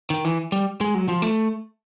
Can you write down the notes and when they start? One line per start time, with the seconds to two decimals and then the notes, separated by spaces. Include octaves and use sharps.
0.10 D#3
0.25 E3
0.52 G3
0.81 G#3
0.95 F#3
1.08 F3
1.22 A3